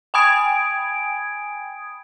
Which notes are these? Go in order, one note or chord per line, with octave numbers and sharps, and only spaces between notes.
G5 G#5 B5 D#6 G#6 D7